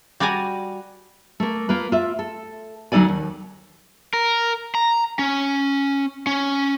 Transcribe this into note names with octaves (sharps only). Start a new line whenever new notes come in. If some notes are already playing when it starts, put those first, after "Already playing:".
G3 F#4 D5 G#5 A#5
A3 A#3
A#3 F4 B4
F4 E5
A4
D2 F#3 D#4 A4 D5 G#5
D#2
A#4
A#5
C#4
C#4